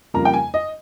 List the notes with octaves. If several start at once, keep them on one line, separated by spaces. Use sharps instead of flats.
F2 C#3 G3 A#3 F4 A#5
G5
G#5
D#5